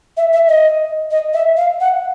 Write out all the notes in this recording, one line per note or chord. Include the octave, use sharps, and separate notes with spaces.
E5
E5
D#5
D#5
E5
F5
F#5